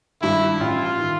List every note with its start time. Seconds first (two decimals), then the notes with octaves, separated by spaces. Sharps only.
0.21 G2 D#3 E4
0.60 A1 F4
1.00 D#3